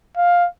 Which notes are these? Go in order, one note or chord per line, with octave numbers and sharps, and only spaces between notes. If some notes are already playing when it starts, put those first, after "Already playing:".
F5